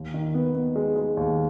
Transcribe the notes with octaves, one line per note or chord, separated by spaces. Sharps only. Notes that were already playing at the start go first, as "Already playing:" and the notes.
Already playing: D#2
D#3
B3
B3
G#3
G#3
D#2